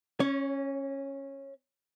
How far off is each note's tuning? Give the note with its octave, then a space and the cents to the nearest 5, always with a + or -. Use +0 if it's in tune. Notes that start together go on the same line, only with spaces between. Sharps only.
C#4 -15 C#5 +25